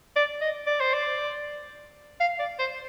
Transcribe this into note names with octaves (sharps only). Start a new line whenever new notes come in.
D5
D#5
D5
C5
D5
F5
D5
C5